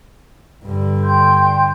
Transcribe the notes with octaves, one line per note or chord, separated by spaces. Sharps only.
G2 D3
G5 C6 G6